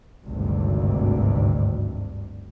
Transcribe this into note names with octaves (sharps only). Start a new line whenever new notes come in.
G#1 D2 G2 C3